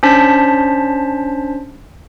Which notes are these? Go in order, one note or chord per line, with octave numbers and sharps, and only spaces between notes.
C#4 D4 C5 A5 B6